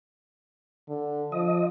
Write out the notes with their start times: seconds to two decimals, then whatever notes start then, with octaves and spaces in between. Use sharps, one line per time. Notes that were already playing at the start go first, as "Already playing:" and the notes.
0.89 D3
1.32 F3 D#5